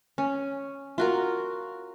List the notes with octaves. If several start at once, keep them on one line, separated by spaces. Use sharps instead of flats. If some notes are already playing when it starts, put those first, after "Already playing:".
C#4
F4 F#4 A#4